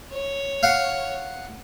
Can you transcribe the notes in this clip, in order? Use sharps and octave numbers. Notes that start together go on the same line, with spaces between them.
C#5
F5 F#5